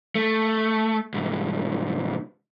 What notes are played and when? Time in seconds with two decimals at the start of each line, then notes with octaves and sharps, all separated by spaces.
0.15 A3
1.14 C2 G#2